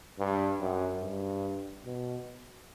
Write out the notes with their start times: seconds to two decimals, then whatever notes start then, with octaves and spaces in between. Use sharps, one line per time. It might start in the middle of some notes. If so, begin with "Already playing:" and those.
0.19 G2
0.60 F#2
1.02 G2
1.85 B2